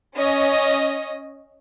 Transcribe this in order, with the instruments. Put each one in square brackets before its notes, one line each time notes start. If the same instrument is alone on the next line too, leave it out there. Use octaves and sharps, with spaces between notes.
[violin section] C#4 D#5